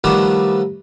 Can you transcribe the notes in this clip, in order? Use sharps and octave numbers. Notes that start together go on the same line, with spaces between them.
D#3 F3 G3 A3 B3 D4